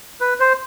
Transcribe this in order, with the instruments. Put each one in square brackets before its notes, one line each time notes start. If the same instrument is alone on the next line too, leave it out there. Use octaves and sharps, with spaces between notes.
[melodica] B4
C5